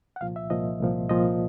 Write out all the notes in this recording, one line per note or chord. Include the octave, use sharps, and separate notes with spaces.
F#5
C2 A#2 F3 F5
E5
C2 A#2 F3 D#5
C2 A#2 F3
C2 A#2 F3 D#5